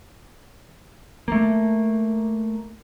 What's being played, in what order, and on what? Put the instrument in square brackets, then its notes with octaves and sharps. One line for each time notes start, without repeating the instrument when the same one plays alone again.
[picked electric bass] A3 A#3